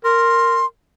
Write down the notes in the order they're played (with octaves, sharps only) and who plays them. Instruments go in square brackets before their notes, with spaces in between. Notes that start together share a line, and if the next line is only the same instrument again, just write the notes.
[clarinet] A#4 [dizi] C6